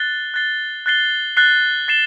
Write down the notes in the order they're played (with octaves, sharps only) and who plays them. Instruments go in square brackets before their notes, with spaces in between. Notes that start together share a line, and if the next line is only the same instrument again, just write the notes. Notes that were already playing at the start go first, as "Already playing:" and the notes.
Already playing: [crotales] F#6 A6 C7 G7
F#6 A6 C7 G7
F#6 A6 C7 G7
F#6 A6 C7 G7
A6 C7 E7 G7